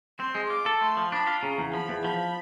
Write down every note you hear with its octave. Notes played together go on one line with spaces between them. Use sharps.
C4 C6
G#3
F4 D6
A4
A3 C6
F3
D4 B5
F4
C#3 A#5
E2
F3 B5
E2
F3 B5